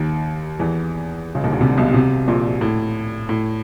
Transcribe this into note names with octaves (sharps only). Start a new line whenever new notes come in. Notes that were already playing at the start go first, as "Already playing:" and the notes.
Already playing: D#2 D#3
E2 E3
C#2 C#3
D#2 D#3
D2 D3
C2 C3
B1 B2
C2 C3
A#1 A#2
A2
A2